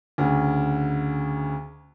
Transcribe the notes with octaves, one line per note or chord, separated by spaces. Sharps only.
D2 C#3